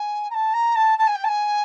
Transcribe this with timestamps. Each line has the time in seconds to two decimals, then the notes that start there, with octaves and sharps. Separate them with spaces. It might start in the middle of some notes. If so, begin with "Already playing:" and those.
Already playing: G#5
0.30 A#5
0.34 A5
0.53 A#5
0.75 A5
0.98 A5
1.07 G#5
1.15 G5
1.24 A5
1.28 G#5